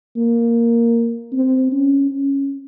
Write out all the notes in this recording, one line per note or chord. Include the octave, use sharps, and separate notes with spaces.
A#3
C4
C#4
C#4